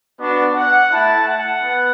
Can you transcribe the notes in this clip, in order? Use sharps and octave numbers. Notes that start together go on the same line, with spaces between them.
B3 D4 F#4 D5
F#5
A3 E4 A5
F#5
B3